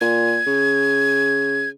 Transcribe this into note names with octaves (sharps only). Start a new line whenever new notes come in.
A#2 G#6
C#3